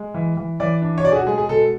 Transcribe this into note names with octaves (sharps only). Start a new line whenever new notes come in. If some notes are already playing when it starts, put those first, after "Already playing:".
Already playing: G#3
E3
E3
E3 D5
D4
C#5
B2 D5
G#4
F#4
G#3 G#4
G#4
B2 A4